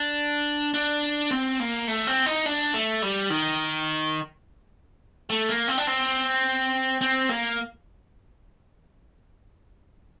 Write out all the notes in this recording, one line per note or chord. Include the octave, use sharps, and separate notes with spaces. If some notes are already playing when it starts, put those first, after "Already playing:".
Already playing: D4
D4
C4
A#3
A3
C4
D#4
D4
A3
G3
D#3
A3
A#3
C4
D4
C4
C4
A#3